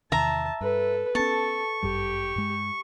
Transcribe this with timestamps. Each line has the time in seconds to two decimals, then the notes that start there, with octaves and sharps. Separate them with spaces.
0.12 E2 C3 D#3 E5 A5 A#5
0.61 G2 A4 B4
1.15 B3 C#4 A4 A5 C#6
1.83 G1 F#2 G3 G4
2.36 G2 G#3